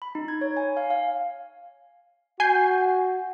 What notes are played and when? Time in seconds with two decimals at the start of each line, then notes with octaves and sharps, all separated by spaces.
0.02 B5
0.15 D#4
0.28 G#6
0.41 C#5
0.57 G#5
0.77 F5
0.90 F5
2.40 F#4 G#5 G6 C7